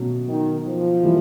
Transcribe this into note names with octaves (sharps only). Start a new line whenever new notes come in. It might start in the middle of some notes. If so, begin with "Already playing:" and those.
Already playing: B2 F#3 A3 C#4 F#4
D#3
F3
E3 G3 A#3 E4